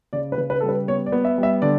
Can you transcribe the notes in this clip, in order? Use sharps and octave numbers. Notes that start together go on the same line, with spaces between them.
C#3 D5
B4
C#3
B4
G3 A4
B4
B3 C#5
D5
B3
E5
G3
E5
D3 D5